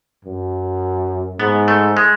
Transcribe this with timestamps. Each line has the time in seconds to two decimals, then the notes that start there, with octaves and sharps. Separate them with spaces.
0.25 F#2
1.40 G#2 B3
1.68 A3
1.97 G#3